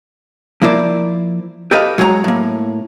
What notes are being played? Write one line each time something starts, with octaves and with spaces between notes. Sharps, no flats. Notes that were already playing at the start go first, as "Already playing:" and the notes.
F3 A#3 E4 C5 D5
G4 A4 B4 D#5 F5
F#3 G#3 C#5 F5 A#5
A2 A#3